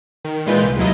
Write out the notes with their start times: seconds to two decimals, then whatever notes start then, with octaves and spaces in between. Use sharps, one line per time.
0.24 D#3
0.46 A#2 E3 G#3 F4 B4 G6
0.64 C2
0.78 D#2 F#3 E4 F4 D#5